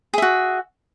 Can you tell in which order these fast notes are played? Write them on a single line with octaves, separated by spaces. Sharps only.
G#4 E5 F#4